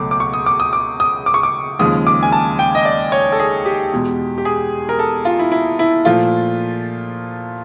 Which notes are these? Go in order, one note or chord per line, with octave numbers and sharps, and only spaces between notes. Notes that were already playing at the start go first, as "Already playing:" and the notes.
Already playing: C#2 B2 F#3 A3 D6
D6
C#6
D#6
D6
D#6
D6
D#6
D6
C#6
D6
D#2 C#3 F3 G#3 D#6
D6
G#5
A5
G5
D#5
D5
C#5
A4
G#4
G4
E2 B2 G#3
G4
G#4
A#4
A4
F4
E4
E4
E4
A#2 F3 A3 F4